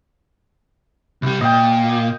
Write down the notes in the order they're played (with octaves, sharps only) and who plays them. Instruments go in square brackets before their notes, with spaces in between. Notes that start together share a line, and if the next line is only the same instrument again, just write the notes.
[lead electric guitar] C2 G3
[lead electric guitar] A#2 [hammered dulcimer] D#5 G5